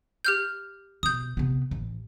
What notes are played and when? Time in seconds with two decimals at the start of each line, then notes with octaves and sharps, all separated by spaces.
0.24 G4 F6 G6
1.03 B2 D#6 G6
1.37 C3 B3
1.71 A1